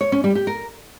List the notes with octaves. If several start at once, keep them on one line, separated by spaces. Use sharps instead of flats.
C#5
C#4
G3
G4
A#4